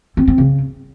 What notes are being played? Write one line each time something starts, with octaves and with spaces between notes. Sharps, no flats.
C4
C4
C#3